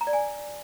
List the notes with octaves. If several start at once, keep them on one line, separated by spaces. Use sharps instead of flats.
A#5
D5
G#5